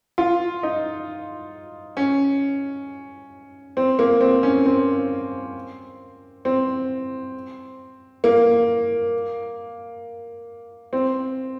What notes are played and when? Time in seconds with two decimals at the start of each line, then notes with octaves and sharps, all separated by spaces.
0.18 F4
0.63 D#4
1.97 C#4
3.77 C4
3.99 A#3
4.21 C4
4.43 C#4
4.66 C4
6.45 C4
8.24 A#3
10.93 C4